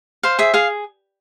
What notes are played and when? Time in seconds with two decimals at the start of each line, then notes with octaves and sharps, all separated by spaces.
0.23 C5 F5
0.39 G#4 E5
0.54 G#4 F5